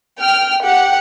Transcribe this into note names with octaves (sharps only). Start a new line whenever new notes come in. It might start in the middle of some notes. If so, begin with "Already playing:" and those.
G5 F6
G4 F#5